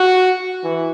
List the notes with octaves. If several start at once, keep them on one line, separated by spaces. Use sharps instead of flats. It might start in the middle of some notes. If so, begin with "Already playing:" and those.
Already playing: F#4
E3